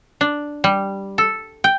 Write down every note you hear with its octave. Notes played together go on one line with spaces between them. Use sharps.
D4
G3
A4
G5